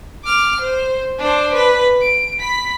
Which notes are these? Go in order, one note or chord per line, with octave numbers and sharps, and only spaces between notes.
D6 F6
C5
D4 C5
B4
D7
B5 B6